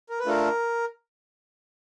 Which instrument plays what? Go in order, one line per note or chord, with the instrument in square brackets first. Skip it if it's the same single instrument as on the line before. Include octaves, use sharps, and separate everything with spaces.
[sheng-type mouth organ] A#4
B4
A3 D4 F4 A4 A#4